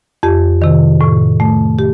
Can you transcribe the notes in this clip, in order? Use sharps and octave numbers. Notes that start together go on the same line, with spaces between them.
F2 G4
C3 D#3
A2
A3
G4